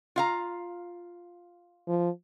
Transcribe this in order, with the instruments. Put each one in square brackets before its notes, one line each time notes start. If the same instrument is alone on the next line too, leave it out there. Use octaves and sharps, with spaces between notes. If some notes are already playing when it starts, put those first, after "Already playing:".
[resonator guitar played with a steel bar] F4 F5 A#5
[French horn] F3